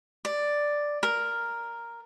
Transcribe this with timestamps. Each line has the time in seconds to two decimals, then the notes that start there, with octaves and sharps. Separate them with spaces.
0.25 D5
1.03 A#4